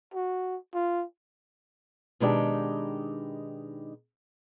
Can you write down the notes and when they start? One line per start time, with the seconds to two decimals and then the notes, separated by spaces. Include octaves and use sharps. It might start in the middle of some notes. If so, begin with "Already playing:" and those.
0.14 F#4
0.74 F4
2.20 B2 D#3 G#3 D4 D#4 G4